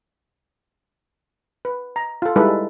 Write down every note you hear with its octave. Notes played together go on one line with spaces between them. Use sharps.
B4
A#5
F4 A4
G3 G#3 D#4 E4 A4 B4